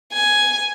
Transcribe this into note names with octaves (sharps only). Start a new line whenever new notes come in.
G#5